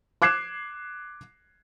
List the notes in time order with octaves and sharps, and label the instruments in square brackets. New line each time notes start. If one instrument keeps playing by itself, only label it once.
[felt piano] D6 F#6 G#6 C7 E7